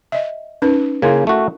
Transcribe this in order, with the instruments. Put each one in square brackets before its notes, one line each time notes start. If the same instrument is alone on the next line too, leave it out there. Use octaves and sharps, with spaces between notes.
[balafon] D#5 E5
C#4 D#4 B4
[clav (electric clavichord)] C#3 A#3 G#5 [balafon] E4 A#4
[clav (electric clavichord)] A3 F#4